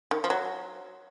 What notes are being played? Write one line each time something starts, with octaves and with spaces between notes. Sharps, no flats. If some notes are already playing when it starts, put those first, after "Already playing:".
D#3
F3
F#3